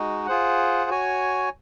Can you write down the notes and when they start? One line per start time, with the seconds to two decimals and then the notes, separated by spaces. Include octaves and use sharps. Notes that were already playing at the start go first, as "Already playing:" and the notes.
Already playing: G#3 D#4 F#4
0.27 F4 G#4 C5 F#5
0.90 F#4 C#5 G#5